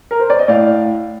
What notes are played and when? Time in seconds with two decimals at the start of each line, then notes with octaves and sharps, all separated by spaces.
0.11 A#4
0.20 C5
0.30 D5
0.39 D#5
0.48 A2 D5 F5